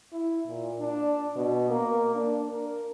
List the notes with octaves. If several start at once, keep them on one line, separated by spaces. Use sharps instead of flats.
E4
A#2
D4
B2
A#3
D4
A#4